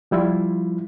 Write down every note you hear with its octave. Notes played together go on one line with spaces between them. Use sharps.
F3 G3 E4 F4